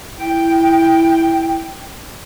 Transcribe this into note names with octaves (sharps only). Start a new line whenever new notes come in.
E4 G5